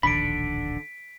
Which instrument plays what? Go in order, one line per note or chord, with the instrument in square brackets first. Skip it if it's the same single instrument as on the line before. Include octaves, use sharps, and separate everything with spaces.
[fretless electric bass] D1 A#1 D#3 [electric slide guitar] D3 [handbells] B5 [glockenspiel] B6 D7